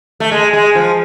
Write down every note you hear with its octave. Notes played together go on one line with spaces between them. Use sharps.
A3
G#3
G#3
F3